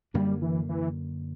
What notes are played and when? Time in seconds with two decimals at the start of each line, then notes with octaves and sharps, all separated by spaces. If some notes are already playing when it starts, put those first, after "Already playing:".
0.14 F#2 D3 G3 A#3 D4
0.42 E3
0.69 E3